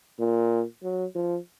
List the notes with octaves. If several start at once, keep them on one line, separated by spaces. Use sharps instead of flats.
A#2
F#3
F3